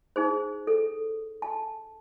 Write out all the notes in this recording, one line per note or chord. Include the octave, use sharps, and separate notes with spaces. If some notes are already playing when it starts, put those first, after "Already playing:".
D#4 G#4 C5
A4
A5